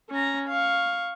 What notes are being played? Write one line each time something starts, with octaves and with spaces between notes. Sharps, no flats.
C#4 A#5
F5 C#6